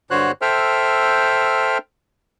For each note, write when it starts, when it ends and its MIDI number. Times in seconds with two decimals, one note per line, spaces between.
0.11 0.31 43
0.11 0.31 50
0.11 0.31 66
0.11 0.31 72
0.11 0.31 73
0.11 0.31 90
0.42 1.78 69
0.42 1.78 72
0.42 1.78 76
0.42 1.78 79
0.42 1.78 89